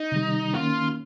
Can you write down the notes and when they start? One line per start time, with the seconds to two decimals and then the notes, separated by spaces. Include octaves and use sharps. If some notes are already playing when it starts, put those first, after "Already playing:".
Already playing: D#4
0.12 C3 D#3 G3
0.54 D#3 A#3 C#4 F4